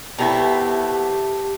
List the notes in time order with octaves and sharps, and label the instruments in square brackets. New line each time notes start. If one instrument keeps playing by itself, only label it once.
[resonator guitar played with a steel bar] B2 B3 E4 [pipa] A3 C4 A#5 [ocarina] G4